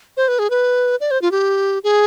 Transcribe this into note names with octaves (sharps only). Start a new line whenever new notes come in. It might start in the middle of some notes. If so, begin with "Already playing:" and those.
C5
B4
G#4
B4
D5
C5
F4
G4
G#4